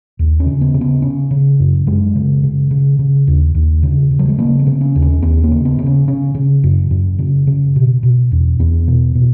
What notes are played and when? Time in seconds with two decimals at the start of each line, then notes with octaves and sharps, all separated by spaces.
0.19 D#2
0.40 C#4
0.46 C#3
0.61 B3
0.74 C#3
0.81 B3
1.02 C#3 C#4
1.31 C#3
1.59 F#2
1.87 F#2 G#3
2.15 C#3
2.43 C#3
2.71 C#3
2.99 C#3
3.27 D#2
3.55 D#2
3.83 C#3
4.11 C#3
4.19 F#3
4.29 G#3
4.38 C#3 A#3
4.59 B3
4.66 C#3
4.81 C#4
4.96 D#2
5.02 C#4
5.22 D#2 B3
5.44 A#3
5.52 C#3
5.65 B3
5.79 C#3
5.86 C#4
6.08 C#3 C#4
6.35 C#3
6.64 F#2
6.91 F#2
7.19 C#3
7.47 C#3
7.76 B2
8.03 B2
8.31 E2
8.59 E2 B3
8.88 B2
9.15 B2